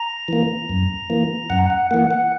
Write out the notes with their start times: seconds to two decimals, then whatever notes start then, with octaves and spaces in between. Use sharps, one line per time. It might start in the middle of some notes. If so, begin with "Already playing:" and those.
Already playing: A#5
0.28 E3 A#3
0.69 F#2
1.10 E3 A#3
1.50 F#2 F#5
1.70 F#5
1.91 E3 A#3 F#5
2.11 F#5